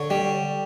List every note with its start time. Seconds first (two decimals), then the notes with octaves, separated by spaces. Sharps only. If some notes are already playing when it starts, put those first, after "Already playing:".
Already playing: D3 C#5
0.10 G3